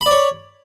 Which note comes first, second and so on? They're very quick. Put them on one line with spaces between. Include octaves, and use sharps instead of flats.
B5 D5 C#5